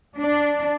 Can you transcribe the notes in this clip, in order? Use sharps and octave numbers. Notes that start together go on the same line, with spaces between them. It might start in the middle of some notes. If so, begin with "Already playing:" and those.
D4